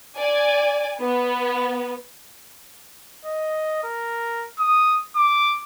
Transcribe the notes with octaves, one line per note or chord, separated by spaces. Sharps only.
D5 G#5
B3
D#5
A#4
D#6
D6